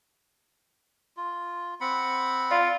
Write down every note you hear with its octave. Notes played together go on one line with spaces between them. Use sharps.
F4
C4 F#5 B5
F4 D5 F5